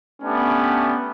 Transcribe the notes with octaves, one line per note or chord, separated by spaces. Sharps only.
A3 B3 C#4 D4 G4